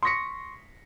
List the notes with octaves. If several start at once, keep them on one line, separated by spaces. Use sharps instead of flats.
C6 C#6 D#6 A#6 B6 C#7